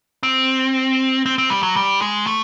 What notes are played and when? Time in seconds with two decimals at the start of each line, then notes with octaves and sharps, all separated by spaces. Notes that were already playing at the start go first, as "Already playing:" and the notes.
0.23 C4
1.26 C4
1.38 C4
1.50 G3
1.63 F#3
1.76 G3
2.01 G#3
2.27 A3